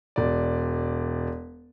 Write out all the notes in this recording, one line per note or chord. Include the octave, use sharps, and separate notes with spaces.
E1 D5